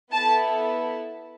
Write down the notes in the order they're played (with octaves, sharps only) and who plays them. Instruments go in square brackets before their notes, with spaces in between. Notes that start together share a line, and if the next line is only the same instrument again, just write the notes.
[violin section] B3 E4 A4 A5